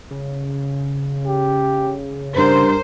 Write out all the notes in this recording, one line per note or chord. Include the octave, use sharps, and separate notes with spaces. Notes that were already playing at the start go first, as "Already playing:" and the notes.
C#3
G4
G2 A#4 C5